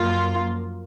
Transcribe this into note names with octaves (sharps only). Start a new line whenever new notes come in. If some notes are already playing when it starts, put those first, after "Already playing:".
Already playing: F#2 F3 A#3 F4